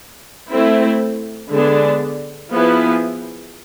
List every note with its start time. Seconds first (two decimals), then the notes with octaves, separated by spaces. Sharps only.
0.50 A3 C4 E4
1.50 D3 G#3 B3 D4 G#4
2.51 F3 B3 E4 G#4 B4